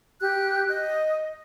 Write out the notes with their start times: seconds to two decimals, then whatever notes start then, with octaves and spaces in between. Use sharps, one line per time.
0.21 G4 F#6
0.68 D#5